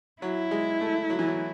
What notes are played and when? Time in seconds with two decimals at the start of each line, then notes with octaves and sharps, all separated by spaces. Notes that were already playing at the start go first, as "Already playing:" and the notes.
0.22 F#3 E4
0.51 G#3
0.81 A3
1.10 F#3
1.19 E3
1.28 F#3